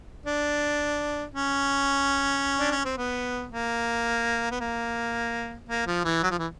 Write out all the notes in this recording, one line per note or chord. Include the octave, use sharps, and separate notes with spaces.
D4
C#4
D4
C#4
C4
B3
A#3
B3
A#3
A#3
F3
E3
F#3
F3
E3